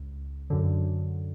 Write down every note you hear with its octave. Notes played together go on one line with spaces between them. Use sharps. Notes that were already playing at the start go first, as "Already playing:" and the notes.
Already playing: C#2
F#2 D3